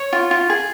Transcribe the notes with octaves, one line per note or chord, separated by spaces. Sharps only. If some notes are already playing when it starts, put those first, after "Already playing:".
Already playing: C#5
F4
F4
G#4